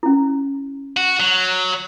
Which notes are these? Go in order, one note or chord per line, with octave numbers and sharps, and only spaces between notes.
C#4 E4
F#4
F#3